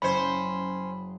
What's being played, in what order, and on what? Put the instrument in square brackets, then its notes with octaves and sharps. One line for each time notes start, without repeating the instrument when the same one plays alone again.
[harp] F#1 C6 [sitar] C#4 C5 [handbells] B5